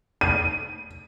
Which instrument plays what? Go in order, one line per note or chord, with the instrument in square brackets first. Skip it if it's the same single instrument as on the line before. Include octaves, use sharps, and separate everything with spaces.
[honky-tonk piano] D#7